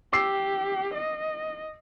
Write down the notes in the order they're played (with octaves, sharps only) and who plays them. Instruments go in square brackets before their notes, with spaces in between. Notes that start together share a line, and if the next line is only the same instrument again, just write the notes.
[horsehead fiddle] G4 [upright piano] D6 E6 C7
[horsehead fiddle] D#5